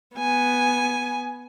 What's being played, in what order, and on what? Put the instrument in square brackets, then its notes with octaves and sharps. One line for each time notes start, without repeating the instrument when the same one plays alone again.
[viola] B3 G#5